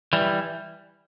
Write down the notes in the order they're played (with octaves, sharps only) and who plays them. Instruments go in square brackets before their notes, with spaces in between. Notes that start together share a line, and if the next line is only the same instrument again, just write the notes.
[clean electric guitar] E3 G3